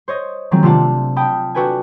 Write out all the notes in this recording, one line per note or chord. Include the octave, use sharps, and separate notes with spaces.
C5 C#5 D#5
D#3 F3 F#3 G#3 C4
C3 A3 D4 F4 F#5 A5
G5 A5 B5 D#6 F6
D4 F#4 A4 B4 G5 G#5